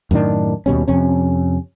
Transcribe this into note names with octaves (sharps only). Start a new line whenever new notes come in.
F#2 A2 D#3 D4
D#2 B2 G3 C#4
F2 C3 C#4